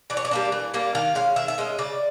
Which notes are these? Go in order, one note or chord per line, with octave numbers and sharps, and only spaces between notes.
E3 D5
C#5
D5
G3 A#3 D4
E3
G3 A#3 D4
D#3 F5
G#3 C#4 F5
D#3 E5
E5
G#3 C#4 D#5
C#3 D5